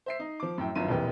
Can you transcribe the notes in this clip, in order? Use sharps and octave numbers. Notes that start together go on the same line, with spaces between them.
C5 E5 C7
D#4
F3 D6
F#2 A2 G5
G1 F#2 D#3 F4 D#7
E1 B1 F2 A#2 E3 G4